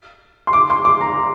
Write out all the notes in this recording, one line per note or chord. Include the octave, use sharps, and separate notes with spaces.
C6
D6
C6
D6
A#5